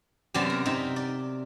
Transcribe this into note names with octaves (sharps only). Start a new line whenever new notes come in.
F#2 C3 F#3 B3 D5 A5
A#4
C3 D#4 E5
D5